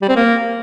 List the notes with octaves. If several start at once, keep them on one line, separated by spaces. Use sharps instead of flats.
G3
C4
A#3